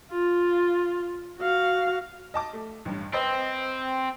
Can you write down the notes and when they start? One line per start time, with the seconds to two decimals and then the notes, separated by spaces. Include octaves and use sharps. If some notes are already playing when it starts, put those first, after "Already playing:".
0.11 F4
1.39 F#4 F5
2.34 D#5 A5 D6
2.53 A3
2.85 A1 G2
3.14 C4 B4 C5 D#5